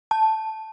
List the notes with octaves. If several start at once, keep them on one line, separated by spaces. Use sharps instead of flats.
A5